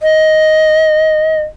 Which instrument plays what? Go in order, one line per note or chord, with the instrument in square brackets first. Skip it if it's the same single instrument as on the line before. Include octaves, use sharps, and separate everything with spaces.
[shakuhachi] D#5